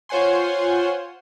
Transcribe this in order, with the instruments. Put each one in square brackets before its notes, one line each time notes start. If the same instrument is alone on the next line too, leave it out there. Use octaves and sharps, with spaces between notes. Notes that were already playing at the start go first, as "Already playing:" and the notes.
[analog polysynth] F4 C5 C#5 F#5 G#5 C6